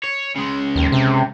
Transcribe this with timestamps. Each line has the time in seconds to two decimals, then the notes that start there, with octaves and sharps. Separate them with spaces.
0.04 C#5
0.36 C#3 G#3
0.76 D#2
0.92 C3